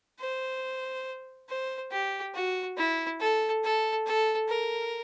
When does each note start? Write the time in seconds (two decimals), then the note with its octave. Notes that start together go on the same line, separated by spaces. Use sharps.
0.20 C5
1.49 C5
1.91 G4
2.34 F#4
2.77 E4
3.20 A4
3.63 A4
4.06 A4
4.48 A#4